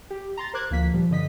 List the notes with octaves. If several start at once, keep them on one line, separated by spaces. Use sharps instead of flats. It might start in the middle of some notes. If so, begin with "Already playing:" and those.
G4
A#5 C6 A6
A#4 C5 D6 F#6 G#6
D2 F3 A#3 B6
A#2 F3 G3
G2 D3 D#5 B6